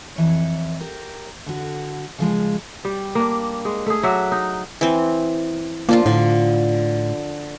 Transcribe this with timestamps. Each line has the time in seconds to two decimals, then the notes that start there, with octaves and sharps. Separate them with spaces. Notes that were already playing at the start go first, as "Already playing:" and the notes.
0.16 F2 E3 C#5
0.80 G4 A#4
1.46 D3 F#4
2.18 C#3 F3 G#3
2.85 G3
3.15 A#3 D4
3.65 G#3
3.86 A3 G#4
4.03 F#3 F#4 D5 E5
4.32 D#4
4.81 E3 C4
5.89 F3 A#3 D4 F4
6.06 A2 D3